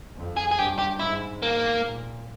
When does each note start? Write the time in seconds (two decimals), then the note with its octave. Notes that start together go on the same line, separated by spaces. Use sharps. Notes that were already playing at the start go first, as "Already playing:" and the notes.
0.16 F2
0.37 G#4
0.51 G#4
0.58 G2 G4
0.78 G4
0.99 G#2 E4
1.42 A#3
1.85 A#2